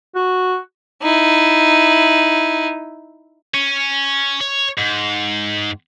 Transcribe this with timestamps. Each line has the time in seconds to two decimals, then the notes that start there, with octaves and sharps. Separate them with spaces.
0.15 F#4
1.02 D#4 E4
3.55 C#4
4.40 C#5
4.78 G#2